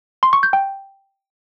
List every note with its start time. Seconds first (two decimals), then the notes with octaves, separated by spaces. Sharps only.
0.23 C6
0.33 C#6
0.43 G6
0.53 G5